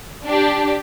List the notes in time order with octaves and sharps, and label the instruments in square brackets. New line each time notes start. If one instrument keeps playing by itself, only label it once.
[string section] D4 G4